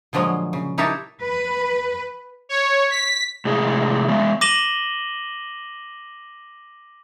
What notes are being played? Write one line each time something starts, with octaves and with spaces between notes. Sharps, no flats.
A#2 D3 F3 F#3 G#3
C#3
D#4 E4 G4 A#4 C#5 A5
B4
C#5
B6
A2 C3 G#3 G#4
G#3 B3
D6 A#6 D#7 E7 F#7 G7